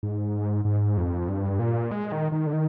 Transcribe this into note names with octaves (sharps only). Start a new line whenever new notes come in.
G#2
G#2
F2
G2
A#2
G#3
D#3
D#3
D3
D#3